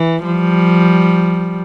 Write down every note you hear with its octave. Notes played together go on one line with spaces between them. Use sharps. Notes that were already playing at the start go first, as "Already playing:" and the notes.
Already playing: E3
F3 G3